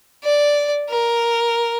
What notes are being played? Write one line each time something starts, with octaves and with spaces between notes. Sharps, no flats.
D5
A#4